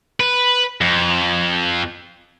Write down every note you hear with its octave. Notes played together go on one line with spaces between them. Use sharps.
B4
F2